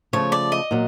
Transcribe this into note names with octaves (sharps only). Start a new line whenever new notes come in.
C#3 F3 A3 C#5
D5
D#5
A#2 F#3